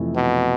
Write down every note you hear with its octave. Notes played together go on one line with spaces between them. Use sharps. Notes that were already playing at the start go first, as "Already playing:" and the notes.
Already playing: F2 C3 E3 A3
B2